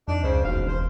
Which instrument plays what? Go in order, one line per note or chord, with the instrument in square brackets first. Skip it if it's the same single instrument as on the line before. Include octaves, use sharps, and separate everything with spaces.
[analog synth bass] F2 [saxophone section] D4 D#4
[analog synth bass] C#2 [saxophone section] C#3 C5
[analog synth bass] E1 [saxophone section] D#2 B2 F5
[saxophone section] C5